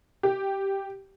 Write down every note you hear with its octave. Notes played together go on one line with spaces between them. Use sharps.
G4